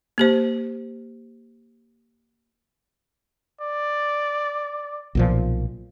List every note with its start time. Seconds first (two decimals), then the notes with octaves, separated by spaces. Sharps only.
0.18 A#3 G4 C5
3.61 D5
5.15 B1 A#2 F3